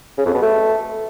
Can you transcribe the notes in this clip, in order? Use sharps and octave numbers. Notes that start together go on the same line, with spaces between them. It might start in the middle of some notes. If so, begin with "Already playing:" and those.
C#3
F2
B2
A3